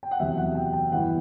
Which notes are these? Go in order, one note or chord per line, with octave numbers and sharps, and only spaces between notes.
G5
F#5
E2 C3 F#3 E5
F#5
G5
G5
G2 E3 B3 E4 F#5